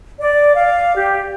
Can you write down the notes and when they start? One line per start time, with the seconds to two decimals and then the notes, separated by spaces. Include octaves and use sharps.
0.20 D5
0.55 F5
0.95 G4